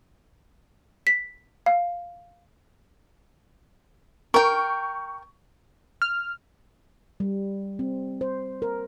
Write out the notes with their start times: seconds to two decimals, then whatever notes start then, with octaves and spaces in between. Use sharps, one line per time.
1.07 B6
1.66 F5
4.34 A#4 G5 C#6
6.02 F6
7.20 G3
7.79 C4
8.21 C5
8.62 A#4